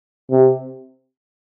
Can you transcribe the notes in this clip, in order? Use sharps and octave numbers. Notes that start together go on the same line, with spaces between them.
C3